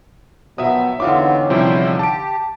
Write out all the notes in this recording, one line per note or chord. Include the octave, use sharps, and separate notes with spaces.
B2 D#3 F3 F#3 E5 D#6
E2 D3 B3 C4 D#4 F4 C#5 D6
C3 F3 G3 E4 C5 G5
G4 A5 D7